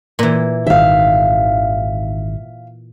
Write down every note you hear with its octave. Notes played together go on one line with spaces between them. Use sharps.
A#2 E3
G#1 D#3 E5 F5